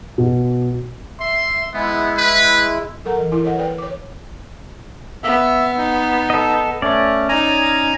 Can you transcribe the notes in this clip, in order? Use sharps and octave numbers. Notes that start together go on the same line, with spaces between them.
B2
E5 C6
G#3 B3 E4
B4
F#3 A4 A#4 F#5 A#5
E3
E4 A#4 G#5 C6
A4 C#5 D#5 F#5
B4 D5 G5
C#5 D6
B3 E5
D#4
A4 D#5
A3 C#4 D5
D#4 G#5 A#5